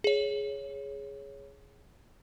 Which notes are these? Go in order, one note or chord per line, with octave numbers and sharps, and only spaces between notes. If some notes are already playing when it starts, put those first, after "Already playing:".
G#4 C#5